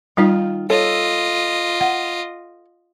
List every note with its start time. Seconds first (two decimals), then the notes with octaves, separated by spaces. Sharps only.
0.17 D#3 G3 D#4 F4 F5
0.70 F4 A4 C#5 D#5
1.81 F#5